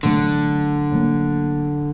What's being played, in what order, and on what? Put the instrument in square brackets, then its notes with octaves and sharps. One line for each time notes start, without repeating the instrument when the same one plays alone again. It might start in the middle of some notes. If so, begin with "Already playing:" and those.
[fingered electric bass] A1 A2 F#3 A3 [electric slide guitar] D3
[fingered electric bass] A2 F#3 A#3